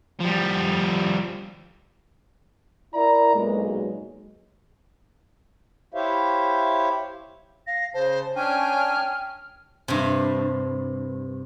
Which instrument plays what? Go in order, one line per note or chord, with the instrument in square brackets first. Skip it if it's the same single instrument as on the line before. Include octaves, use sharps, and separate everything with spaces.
[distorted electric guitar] F3 G3
[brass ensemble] E4 A#4 D5 A#5
B1 A#2 G#3
[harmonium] E4 G4 C5 C#5 E5 F5
[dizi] F5 [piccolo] A#6
[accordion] C#3 [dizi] C5 [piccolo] A5
[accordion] C#4 D4 G#5 [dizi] G5 [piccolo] F6
[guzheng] G2 C3